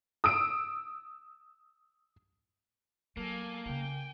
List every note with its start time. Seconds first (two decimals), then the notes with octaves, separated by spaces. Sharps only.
0.24 D#6 E6 D7
3.17 F#3 A#3 A4 G#5
3.66 C#3 E4 G5 G#5